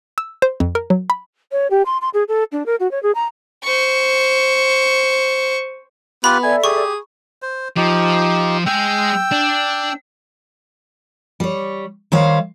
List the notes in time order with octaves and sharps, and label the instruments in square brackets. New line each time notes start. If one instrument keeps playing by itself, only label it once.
[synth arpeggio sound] E6
C5
F2
A#4
F#3
B5
[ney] C#5
G4
C6
C6
G#4
A4
D4
A#4
F#4
C#5
G#4
A#5
[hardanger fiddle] C5 C#6
[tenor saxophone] B3 [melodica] F4 G4 B4 [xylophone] B5
[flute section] A4 D5 E5 [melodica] G#5
[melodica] G4 [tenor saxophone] G#4 [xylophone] C#6
[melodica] C5
[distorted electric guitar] F3 [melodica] D#4 G4
[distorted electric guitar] G#3 G#4 [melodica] G5 E6
[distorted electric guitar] D4
[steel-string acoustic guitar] G3 C#5
D#3 G3 C5 C#5 F5